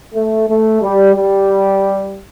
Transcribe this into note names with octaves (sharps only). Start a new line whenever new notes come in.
A3
A3
G3
G3